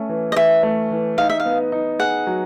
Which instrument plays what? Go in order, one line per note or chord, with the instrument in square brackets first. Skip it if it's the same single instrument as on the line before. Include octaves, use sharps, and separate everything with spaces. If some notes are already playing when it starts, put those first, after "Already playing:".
Already playing: [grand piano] A3 C#4
E3
[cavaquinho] D#5
[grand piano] E3 [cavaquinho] E5
[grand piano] A3
E3
[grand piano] D#4 [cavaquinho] F5
[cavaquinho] E5
F5
[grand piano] B3
D#4
[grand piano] G#4 [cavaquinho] F#5
[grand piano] F#3